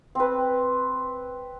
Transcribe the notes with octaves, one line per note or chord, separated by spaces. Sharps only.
C4 B4